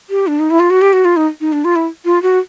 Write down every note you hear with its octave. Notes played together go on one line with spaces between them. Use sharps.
G4
D4
D#4
E4
F4
F#4
G4
F#4
F4
D#4
D#4
D4
F4
E4
F4
F#4